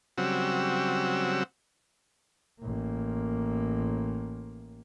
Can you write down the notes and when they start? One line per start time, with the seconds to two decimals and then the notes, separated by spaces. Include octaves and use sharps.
0.18 C#3 F#3 G3 C4 F#4 E6
2.61 A1 A#3